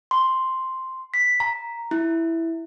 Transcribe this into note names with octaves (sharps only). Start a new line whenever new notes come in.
C6
B6
A#5
E4